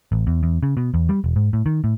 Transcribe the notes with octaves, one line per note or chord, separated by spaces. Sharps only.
A1
E2
E2
C#3
B2
E2
G3
E1
G#2
A2
D#3
A2